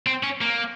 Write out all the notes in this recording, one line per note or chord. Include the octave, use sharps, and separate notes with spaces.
C4
C#4
A#3